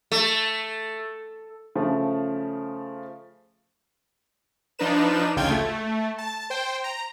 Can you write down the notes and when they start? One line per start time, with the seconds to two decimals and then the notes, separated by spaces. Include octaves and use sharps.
0.12 A3
1.75 C#3 F3 A3
4.79 F3 D4 D#4 B4 E7
5.36 A1 D2 C#3 F4 G5 G#6
5.50 A3
6.18 A5
6.50 C5 G5
6.84 A#5